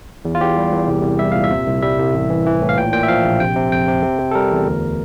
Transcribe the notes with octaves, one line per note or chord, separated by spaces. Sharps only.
E2
F4
E2 G4
G3
E2
C2
C2
G3 E5
A#2 F5
E5
C3
C2
G3 E5
C2
A1
E3
E3
A2
F5
A#2 G5
A#2 G5
E5
F3 F5
A#1
C3 G5
C3
F2 G5
C3
C3
C3
A4
G3 A#4
E2
D2